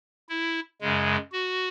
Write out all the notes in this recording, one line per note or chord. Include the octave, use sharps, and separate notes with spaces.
E4
F#2 C#3 G#3
F#4